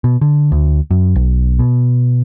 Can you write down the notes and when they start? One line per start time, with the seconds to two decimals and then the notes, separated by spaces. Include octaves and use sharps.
0.04 B2
0.21 D3
0.52 D2
0.91 F#2
1.16 B1
1.59 B2